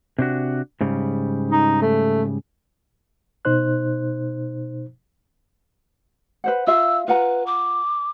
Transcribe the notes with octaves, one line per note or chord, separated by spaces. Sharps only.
C3 D4 F#4
G#2 C#3 G3
D#4
A3
B2 D#4 C5 F#6
B4 C5 F#5
F4 E5 F5 E6
F4 B4 F#5 A#5
D6